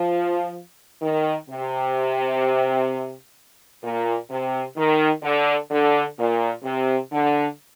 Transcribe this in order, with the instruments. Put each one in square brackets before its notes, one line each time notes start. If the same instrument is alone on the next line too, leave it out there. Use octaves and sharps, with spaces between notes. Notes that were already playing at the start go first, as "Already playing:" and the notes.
Already playing: [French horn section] F3
D#3
C3
A#2
C3
D#3
D3
D3
A#2
C3
D3